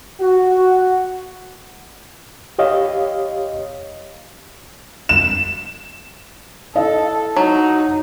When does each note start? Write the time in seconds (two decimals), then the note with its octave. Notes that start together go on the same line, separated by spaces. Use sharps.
0.20 F#4
2.59 G4 C#5 D#5 F5
5.09 E7
6.75 E4 A4 D#5 F5
7.37 F#3 D#4